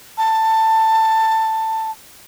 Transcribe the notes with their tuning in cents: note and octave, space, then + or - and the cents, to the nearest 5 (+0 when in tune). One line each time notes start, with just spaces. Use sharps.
A5 +15